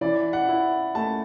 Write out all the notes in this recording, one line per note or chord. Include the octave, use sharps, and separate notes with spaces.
E3 D5
F#5
E4
A3 A5